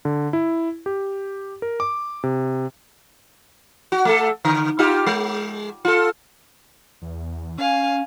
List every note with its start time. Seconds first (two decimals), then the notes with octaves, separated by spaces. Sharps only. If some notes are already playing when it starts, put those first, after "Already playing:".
0.05 D3
0.33 E4
0.86 G4
1.62 A#4
1.80 D6
2.23 C3
3.92 F#4
4.05 A3 A4
4.45 D3
4.79 D#4 F4 G4
5.06 G#3
5.85 F4 A4
7.02 E2
7.58 C#4 F5 G#5